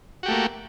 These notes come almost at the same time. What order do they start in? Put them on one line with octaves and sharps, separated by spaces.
F#4 G4 A3 A#3